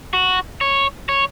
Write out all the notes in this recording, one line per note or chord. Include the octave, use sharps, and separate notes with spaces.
F#4
C#5
C#5